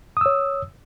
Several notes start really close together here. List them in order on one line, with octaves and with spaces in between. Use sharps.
D#6 E6 C#5